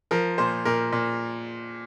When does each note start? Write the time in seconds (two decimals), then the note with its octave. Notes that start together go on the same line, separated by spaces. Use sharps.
0.11 F3 A#4
0.38 A#2 C5
0.65 A#2 A#4
0.92 A#2